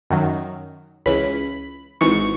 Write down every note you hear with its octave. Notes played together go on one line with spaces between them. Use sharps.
F#2 D#3 F#3
C#2 C#3 E3 B5
G#1 G#2 E3 C#6